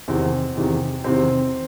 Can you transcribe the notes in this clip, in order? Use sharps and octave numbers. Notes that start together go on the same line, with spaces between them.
E2 C3 D#3 C4
E2 C3 D#3
E2 C3 D#3 C4